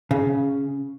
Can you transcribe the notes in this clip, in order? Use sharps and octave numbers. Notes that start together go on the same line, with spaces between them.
C#3